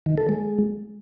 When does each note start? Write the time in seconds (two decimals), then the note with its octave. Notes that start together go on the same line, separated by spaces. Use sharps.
0.06 D#3
0.18 A4
0.29 G#3